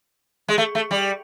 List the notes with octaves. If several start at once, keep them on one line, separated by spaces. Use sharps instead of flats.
G#3
A3
A3
G3